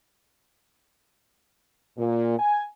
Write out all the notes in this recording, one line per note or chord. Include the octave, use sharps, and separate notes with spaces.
A#2
G#5